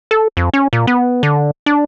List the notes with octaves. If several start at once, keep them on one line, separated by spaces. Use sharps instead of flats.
A4
F2
C#4
A#2
B3
D3
D4